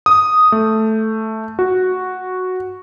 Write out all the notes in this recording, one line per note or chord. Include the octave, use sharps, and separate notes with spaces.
D#6
A3
F#4